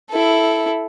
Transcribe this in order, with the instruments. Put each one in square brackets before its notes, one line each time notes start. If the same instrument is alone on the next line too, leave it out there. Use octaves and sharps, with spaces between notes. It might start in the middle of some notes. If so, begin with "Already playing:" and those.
[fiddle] E4 A4